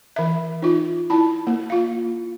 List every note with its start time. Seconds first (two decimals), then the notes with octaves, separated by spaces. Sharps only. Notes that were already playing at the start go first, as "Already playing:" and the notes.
0.16 E3 E5
0.62 D#4 F4
1.10 E4 A5
1.47 A#3
1.70 F4 F5